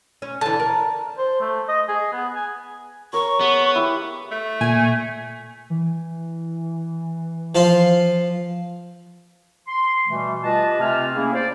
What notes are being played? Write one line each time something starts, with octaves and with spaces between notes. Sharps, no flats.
C#4
D3 E3 A5
A#4
C5
A3
D#5
G#4
B3
G#5
A#4 C#5 C#6
B3 G#4
E4 G4
A3
A#2 G#5
E3
F3 F4 C6
C6
B2 E3 G3 A3
F4 G4 B4 D#5 A5
C3 A3 C4 F4 G#5 F6
A#3 C#4 E4 G#4
C5 D5